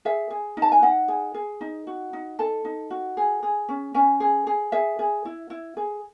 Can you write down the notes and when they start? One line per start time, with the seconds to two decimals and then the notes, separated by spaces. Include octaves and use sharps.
0.05 G#4 E5
0.30 G#4
0.57 D#4
0.62 A5
0.72 G#5
0.82 D#4 F#5
1.08 G#4
1.34 G#4
1.61 D#4
1.87 F#4
2.13 D#4
2.39 A4 A5
2.65 D#4
2.90 F#4
3.17 G#4
3.43 G#4
3.69 C#4
3.94 C#4 G#5
4.20 G#4
4.47 G#4
4.72 G#4 E5
4.99 G#4
5.25 E4
5.50 E4
5.77 G#4